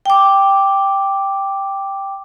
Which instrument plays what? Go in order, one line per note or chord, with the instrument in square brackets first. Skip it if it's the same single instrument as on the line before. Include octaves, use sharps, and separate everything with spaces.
[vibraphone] G5 D6